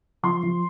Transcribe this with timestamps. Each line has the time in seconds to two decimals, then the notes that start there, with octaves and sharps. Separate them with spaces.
0.23 F3 C6
0.43 F3